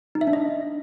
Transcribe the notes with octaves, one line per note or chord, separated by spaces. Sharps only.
D#4
E5
D4
D#5